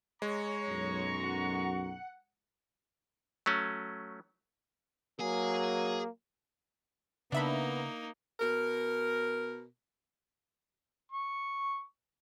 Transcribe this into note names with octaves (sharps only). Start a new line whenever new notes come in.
G#3 C#5 A#5 C#6
B1 F#2
F#5
F#3 A3 C#4
F#3 A#3 G#4 G#5
C#3 A#3 B3 D4 D#4 E5 B5
B2 A#4
C#6